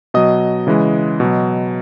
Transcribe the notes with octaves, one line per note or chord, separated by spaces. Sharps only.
B2 F#3 D#5 D#6
C#3 E3 G#3
B2 F#3